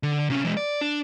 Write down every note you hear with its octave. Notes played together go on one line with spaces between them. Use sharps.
D3
C3 C#4
E3 G#3
D5
D4